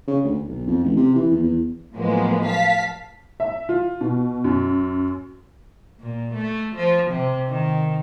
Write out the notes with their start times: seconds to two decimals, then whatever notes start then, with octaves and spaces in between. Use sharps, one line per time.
0.07 C#3
0.24 D2
0.48 B1
0.67 F2
0.84 A1
0.96 C3
1.15 E3
1.31 E2
1.43 E2
1.93 A2 F3 F#3 G#3 A#3 B3
2.45 F5 A5 B6
3.40 E5
3.69 F4
4.01 B2
4.44 F#2
6.00 A#2
6.35 A3
6.76 F3
7.11 C3
7.48 D#3